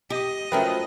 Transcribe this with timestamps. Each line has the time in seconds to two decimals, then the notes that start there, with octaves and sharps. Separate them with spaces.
0.10 G4 D#5
0.52 F3 F#3 A3 C#4 A#4 B4 G5